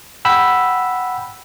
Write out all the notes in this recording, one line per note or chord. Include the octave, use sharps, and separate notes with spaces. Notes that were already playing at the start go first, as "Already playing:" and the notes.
F#5 G5 B5 E6